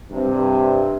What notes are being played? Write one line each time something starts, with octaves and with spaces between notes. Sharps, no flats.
G2 C3